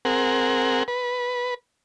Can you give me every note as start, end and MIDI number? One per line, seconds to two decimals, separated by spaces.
0.05 0.83 60
0.05 0.83 68
0.05 0.83 70
0.05 0.83 78
0.88 1.54 71